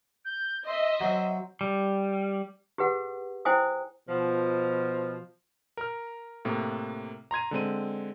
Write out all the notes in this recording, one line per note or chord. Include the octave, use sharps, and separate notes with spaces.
G6
D#5 E5 C6
F#3 C4
G3
G4 G#4 B4 F#5
E4 C5 G5 G#5 D#6
B2 F3
A#4 F6
A2 C3 A#3
A#5 C6 G#6 D#7
D3 G#3 C4 D#7